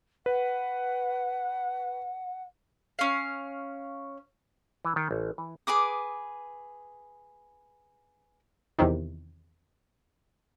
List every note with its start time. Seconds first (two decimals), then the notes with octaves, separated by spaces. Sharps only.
0.26 B4 F#5
2.99 C#4 F5
4.85 E3
4.96 D#3
5.11 A1
5.38 E3
5.67 G#4 B4 D6 D#6
8.79 E2 C3 D#3